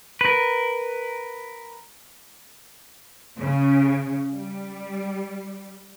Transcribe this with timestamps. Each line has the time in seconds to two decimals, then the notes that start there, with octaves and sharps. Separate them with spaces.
0.21 A#4 B4
3.39 C#3
4.34 G3